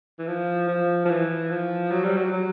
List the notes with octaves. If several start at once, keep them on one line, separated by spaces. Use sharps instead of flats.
E3
F3
F3
F3
E3
F3
F#3
G3
F#3
F#3